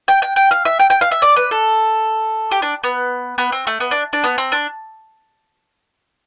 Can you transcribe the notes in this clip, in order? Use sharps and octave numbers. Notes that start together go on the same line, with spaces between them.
G5
G5
G5
F5
E5
G5
G5
F5
E5
D5
B4
A4
G4
D4
B3
B3
C4
A3
B3
D4
D4
B3
C4
D4